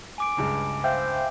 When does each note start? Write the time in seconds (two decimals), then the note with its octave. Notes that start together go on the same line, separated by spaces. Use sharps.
0.18 G#5 D6 D7
0.37 C#2 G2 C#3
0.84 C5 E5 F5 G5